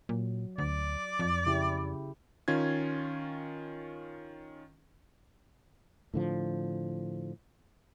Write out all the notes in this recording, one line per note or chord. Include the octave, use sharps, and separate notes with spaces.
A#2 F#3
D2 D5
F2
C#3 E4 G4
D#3 C#4 F4 G#6
A2 D3 F3